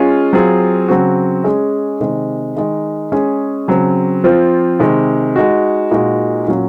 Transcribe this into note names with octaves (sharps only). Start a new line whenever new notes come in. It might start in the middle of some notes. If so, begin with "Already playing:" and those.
Already playing: G#3 C#4 F4 G#4
F#3 C4 F4 G#4
C#3 F#3 C4 F#4
G#3 C#4 G#4
C3 D#3 G#3
D#3 G#3 D#4
G#3 C#4 G#4
C#3 F#3 C4
F3 C4 F4
C3 D#3 G#3
G#3 D#4 F#4
A#2 G#3 D#4 F#4
A#2 F#3 C#4 F#4